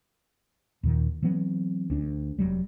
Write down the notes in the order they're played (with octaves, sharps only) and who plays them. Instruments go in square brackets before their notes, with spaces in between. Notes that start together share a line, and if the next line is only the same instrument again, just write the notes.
[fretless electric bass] D#2 A#2 D#3
E3 F#3 B3 C4
D2 D4
F1 E2 F#3 G3